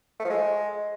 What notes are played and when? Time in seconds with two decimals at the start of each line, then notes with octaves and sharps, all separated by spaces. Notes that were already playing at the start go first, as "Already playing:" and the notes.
0.20 A3
0.25 F3
0.30 G#3